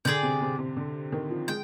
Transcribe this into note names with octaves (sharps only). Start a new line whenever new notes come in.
D3 G#4 D5 G5
C3
C3
C3
D3
D#3
F3
G#3 G5